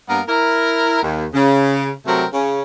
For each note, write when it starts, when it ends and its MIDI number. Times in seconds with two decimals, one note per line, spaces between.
0.09 0.22 43
0.09 0.22 58
0.09 0.22 59
0.09 0.22 70
0.29 1.00 64
0.29 1.00 70
1.03 1.26 39
1.34 1.91 49
2.06 2.24 48
2.06 2.24 54
2.06 2.24 57
2.06 2.24 60
2.06 2.24 70
2.33 2.63 49
2.33 2.63 61